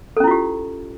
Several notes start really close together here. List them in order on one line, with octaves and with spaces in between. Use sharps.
A4 C#4 E4 F4 G4